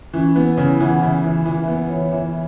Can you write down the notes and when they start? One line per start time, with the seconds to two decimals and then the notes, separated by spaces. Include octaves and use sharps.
0.14 E3 C#4
0.36 B3 E4
0.57 C#3 E4
0.80 E3 F#5
1.02 C#3 E5
1.24 E3
1.31 E5
1.46 E3
1.60 E5
1.68 B3
1.89 E3 C#5
2.12 E3 E5